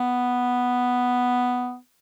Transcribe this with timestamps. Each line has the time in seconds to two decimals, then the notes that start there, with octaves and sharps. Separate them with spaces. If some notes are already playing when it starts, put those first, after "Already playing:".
Already playing: B3